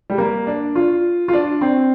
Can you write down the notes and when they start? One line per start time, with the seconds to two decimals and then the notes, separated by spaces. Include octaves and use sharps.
0.10 G3
0.18 A#3
0.47 D4
0.75 F4
1.28 F4
1.33 D4
1.61 C4